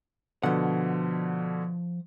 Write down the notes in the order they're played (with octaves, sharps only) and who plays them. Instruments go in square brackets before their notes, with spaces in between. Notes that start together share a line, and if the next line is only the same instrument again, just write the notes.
[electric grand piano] B2 D3 [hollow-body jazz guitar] F3 F#5